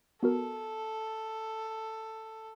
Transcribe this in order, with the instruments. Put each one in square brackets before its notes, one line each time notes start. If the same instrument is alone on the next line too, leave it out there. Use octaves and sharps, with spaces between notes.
[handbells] B3 F#4 A#4 [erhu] A4